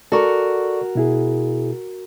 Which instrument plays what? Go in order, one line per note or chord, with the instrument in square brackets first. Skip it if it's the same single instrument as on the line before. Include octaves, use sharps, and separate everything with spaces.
[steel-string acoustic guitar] F#4 A#4 [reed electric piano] A4 D5 C#6
[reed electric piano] B2 E4 G#4